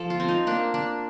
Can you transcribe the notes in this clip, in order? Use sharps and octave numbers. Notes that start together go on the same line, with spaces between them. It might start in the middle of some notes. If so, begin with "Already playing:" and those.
Already playing: F3 A4
F4
C4
D#4
A#3 D4
D4